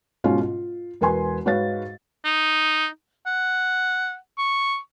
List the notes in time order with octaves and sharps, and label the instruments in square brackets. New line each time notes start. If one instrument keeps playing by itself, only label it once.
[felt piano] G#2 B2 C#4 F4 F#4
F4
E1 A#4 B4 G#5 C6
G#2 F#4 B4 C#5 F5 A6
[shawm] D#4
F#5
C#6